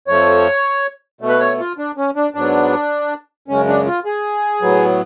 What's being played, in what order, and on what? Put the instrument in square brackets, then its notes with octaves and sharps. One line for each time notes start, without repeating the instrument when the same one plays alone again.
[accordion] F2 F3 A3 C#5
B2 A3
B4
C#5
F4
D4
C#4
D4
G#2 F#3 B3 D4
F#2 C#3 G#3 C#4
D4
F4
G#4
A2 F#3 B3